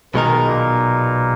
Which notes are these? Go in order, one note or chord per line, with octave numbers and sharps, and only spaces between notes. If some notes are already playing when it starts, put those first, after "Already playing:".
B1 B2 D#3 G#3 D#4 A#4
A#2